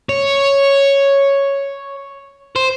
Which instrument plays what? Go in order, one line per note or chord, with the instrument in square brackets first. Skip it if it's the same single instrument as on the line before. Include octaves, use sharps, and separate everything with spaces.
[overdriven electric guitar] C#5
C5